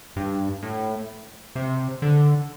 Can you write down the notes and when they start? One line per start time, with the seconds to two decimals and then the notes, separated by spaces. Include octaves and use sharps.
0.16 G2
0.63 A2
1.56 C3
2.02 D3